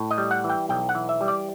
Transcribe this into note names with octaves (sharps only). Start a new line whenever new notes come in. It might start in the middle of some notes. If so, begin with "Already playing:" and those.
Already playing: A2
D#5
G3
F#5
E3
G5
B1 G5
F#5
E3
E5
G3
D5